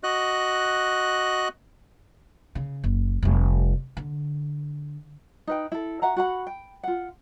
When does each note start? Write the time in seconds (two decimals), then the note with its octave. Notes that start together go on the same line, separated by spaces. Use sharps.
0.04 F#4 D#5 F#6
2.55 C#3
2.84 F#1
3.23 F1 G3
3.97 D3
5.47 D#4 B4 G5
5.72 E4 A4
6.02 F#4 E5 F#5 A#5
6.16 F#4 F#5 B5
6.47 G5
6.83 F4 F#5